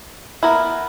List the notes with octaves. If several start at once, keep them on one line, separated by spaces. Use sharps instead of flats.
B3 E4 A#4